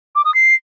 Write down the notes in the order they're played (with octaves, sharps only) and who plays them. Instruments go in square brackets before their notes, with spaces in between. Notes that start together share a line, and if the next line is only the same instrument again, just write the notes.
[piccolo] D6
D#6
C7